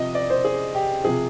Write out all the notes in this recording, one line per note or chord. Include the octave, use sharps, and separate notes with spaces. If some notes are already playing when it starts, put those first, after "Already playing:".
Already playing: C3 F3 D#5
D5
C5
G#4
G4
C3 F3 G#4